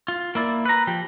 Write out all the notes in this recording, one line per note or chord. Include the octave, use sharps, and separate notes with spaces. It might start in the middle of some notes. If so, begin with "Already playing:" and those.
F4
A#3 E4 D5
B4 A#5
F3 G4